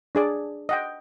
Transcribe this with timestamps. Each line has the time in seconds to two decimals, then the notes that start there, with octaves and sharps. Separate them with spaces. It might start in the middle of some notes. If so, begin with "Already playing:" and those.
0.15 D4 G#4 D5
0.69 D#5 F#5 G5